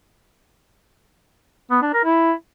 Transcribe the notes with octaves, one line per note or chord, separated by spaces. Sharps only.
B3
D4
A#4
E4